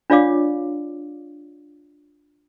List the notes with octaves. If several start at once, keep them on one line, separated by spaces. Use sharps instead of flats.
D4 F4 C#5 D5 F5 D6